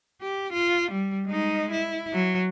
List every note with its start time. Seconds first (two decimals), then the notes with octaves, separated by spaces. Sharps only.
0.22 G4
0.53 F4
0.91 G3
1.27 G#3 D#4
1.71 E4
2.13 F#3